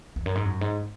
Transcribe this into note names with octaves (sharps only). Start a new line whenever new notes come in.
E2
F#2
G#2
F#2
G#2